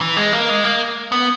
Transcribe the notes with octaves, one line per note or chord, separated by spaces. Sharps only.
E3
G#3
A#3
G#3
A#3
B3